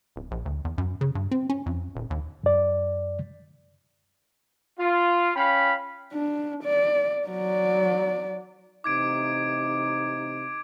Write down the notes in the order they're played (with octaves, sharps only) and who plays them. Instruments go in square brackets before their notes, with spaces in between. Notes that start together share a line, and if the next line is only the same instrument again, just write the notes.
[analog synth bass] D1
A#1
D2
E2
F#2
C#3
G2
C4
C#4
F2
D#1
D#2
[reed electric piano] F#2 D5
[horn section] F4
C#4 F5 G5 B5
[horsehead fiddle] D4
D5
F#3 D5
[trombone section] A1 C3 D#4 [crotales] D6 G#6 D7